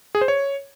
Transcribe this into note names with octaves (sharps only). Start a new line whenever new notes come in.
G#4
C5
C#5